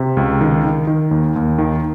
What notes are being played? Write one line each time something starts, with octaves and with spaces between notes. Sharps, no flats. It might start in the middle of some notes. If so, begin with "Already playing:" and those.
Already playing: C3
C#2
D#3
D#3
D#3
D#2
D#2
D#3